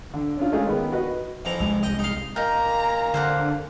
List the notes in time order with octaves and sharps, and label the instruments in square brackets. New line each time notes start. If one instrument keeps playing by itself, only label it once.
[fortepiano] D3
C#4 D4 F4
G#3 A3 C#4 D#4 F4 G#4
D#3 B3
F#4 B4 D#5
[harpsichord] F2 E3 A#5
[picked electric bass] C2 G#3
[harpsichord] D#5 G5
D#4 F5
[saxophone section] A#2 A#3 [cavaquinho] D#4 F5 [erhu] A#5
[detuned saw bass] D3 [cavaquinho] C5 F5 F#5